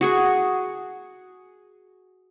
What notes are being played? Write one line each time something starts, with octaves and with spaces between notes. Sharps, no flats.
F#4 G#4 C#6